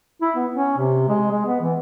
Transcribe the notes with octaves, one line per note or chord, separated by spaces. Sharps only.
E4
B3
C#4
C3
G#3
G#3
B3
E3